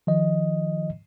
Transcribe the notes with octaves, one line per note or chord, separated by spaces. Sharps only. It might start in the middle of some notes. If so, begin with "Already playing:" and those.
D#3 F3 D#5